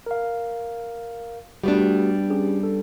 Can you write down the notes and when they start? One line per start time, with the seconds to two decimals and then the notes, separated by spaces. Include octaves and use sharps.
0.06 A#4 F5
1.64 G3 A3 B3 D4 F#4 G4
2.30 C#4 G4 G#4
2.63 A4